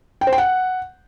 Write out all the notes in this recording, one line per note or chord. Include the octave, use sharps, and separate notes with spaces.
G5
C5
G5
F#5